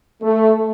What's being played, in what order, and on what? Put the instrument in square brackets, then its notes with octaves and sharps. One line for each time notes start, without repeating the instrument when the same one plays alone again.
[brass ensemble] A3